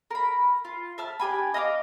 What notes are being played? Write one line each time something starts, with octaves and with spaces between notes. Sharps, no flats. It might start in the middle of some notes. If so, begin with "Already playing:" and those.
A#4 B5
F4
E5 A5 F6
D4 G4 G#5 B5
D#5 F5 B5 D6